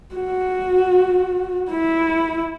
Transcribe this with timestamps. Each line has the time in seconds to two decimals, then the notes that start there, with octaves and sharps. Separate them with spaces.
0.15 F#4
1.71 E4